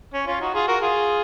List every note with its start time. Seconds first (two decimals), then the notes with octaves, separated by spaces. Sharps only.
0.14 C#4
0.27 C#4 F4
0.40 D#4 F#4
0.54 F4 G#4
0.67 F#4 A#4
0.81 F4 G#4